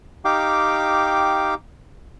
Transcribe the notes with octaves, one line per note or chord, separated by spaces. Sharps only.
D#4 G4 F5 G5 D6